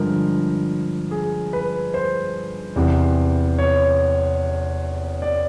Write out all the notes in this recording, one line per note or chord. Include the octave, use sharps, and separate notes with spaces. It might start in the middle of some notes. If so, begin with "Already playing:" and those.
Already playing: G2 D3 F3 G#3 A#4
G#4
B4
C5
E2 C3 E3
C#5
D5